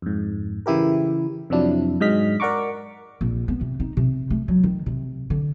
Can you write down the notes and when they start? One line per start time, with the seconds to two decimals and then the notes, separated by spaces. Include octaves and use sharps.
0.02 F2 G#2
0.66 C#3 E3 E4 G4 A#4
1.50 F2 C3 F3 F#3 D4 E4
2.01 G#2 F#3 G#3 D#5 F6 B6
2.40 A#4 D5 F#5 A#5 C#6 D6
3.21 A#1
3.48 B3
3.61 C3
3.80 D#4
3.97 C3
4.30 A3
4.48 F#3
4.64 D#3
4.86 C3
5.30 D3